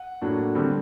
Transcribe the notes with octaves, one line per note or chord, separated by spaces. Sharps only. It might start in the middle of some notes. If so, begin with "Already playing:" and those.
Already playing: F#5
A2 F#3 A#3 D4
D3 G3 C4